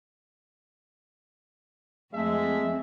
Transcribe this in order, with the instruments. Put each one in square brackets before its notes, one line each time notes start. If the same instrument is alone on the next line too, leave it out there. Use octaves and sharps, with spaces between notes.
[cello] F2 C4 [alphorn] G#3 [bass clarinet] A3 [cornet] E5